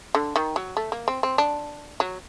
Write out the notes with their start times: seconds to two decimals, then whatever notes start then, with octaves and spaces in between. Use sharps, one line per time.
0.15 D3
0.36 D#3
0.56 F#3
0.77 A3
0.92 A#3
1.08 C4
1.23 C4
1.38 D4
2.00 F#3